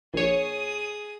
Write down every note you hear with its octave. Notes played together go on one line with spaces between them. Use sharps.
A#1 G#4 C#5 D#6